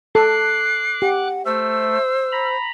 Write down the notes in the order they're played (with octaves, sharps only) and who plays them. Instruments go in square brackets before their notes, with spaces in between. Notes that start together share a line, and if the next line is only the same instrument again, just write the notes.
[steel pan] A4 [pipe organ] D6 F#6 [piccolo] C7
[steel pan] G4 [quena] F#5
[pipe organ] A3 [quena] C5 [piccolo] E6
[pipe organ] A#5 B5